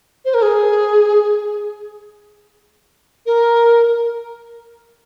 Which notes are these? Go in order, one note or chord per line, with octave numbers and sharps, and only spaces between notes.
C5
A#4
G#4
A#4